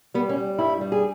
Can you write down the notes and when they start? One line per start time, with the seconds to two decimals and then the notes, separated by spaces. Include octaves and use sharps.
0.14 G3 B3
0.29 C#4
0.37 G3
0.59 G2 E4
0.81 G3
0.92 G#4